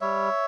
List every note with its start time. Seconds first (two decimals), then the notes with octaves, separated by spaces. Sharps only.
0.01 G3 C#5 E5